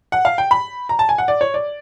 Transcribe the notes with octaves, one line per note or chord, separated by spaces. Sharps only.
F#5
F5
G5
B5
A#5
A5
G#5
F#5
D5
C#5
D5